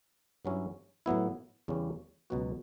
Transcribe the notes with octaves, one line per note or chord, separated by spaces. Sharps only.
G2 F#3 C#4 E4
A2 F#3 B3 E4
E2 C#3 G3 C#4
C#2 B2 F#3 B3 F#4